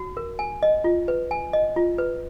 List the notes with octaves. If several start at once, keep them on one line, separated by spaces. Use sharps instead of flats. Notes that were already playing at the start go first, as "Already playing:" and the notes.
Already playing: F#4
A#4
G#5
D#5
F4
B4
G#5
D#5
F4
B4